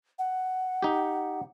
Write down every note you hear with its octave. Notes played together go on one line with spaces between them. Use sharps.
F#5
D#4 G4